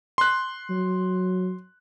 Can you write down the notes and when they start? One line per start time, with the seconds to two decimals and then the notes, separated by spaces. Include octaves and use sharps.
0.18 C6 F#6
0.70 F#3